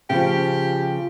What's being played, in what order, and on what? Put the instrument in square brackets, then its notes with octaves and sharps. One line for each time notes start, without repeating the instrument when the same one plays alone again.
[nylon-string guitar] C#3 F3 [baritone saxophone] G4